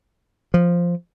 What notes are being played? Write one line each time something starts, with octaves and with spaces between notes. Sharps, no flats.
F3